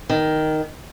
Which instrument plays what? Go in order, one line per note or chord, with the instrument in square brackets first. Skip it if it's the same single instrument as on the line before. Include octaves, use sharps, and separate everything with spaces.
[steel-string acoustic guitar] D#3